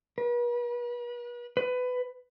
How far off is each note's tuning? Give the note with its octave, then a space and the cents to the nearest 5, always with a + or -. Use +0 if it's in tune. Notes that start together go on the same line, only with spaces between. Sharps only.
B4 -40
B4 +20